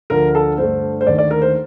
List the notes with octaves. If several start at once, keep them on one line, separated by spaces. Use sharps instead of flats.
D2 D3 F3 A#4
A4
G2 D3 A3 C5
C5
D#2 D3 A3 D5
D5
A#4
C5